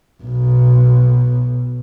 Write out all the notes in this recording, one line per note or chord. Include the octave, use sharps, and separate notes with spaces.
B1 B2